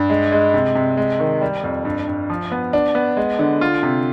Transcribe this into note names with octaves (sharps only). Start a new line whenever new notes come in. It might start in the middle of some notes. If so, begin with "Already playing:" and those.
Already playing: G2
G#3
G#3
C3
C3
G#3
D#3
G3
F2
G2
G2
F3
B3
D4
B3
G#3
D3
F4
C3